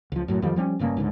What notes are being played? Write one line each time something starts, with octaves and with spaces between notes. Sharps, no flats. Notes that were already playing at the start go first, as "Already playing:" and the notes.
C#2 F3
F#2 A2 F#3
F2 D#3 F3 G3
F3 G3 C4 C#4
F1 G2 C#3 A#3
C#2 G#2 D3